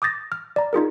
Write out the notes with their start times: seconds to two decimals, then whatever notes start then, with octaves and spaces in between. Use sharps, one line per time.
0.02 D6 D#6 G6 A6 A#6
0.32 F6
0.56 D5 A#5
0.73 D#4 F4 G#4 A#4